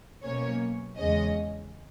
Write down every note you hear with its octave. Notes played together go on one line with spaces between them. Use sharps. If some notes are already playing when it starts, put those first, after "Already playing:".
B2 F#3 A#3 C#4 C#5
E2 C#3 G#3 C#4 D#5